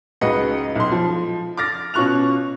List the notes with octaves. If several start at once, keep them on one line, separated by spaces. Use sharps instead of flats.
C#2 G#2 F#4 B4 D#5 C#7
B1 C6
F3
D6 F6 A6 A#6
B2 C#4 F4 C#6 F#6 F7